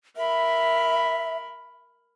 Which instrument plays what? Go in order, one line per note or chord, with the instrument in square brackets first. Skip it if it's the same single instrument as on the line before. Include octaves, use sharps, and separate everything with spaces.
[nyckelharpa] A#4 B5 [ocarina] E5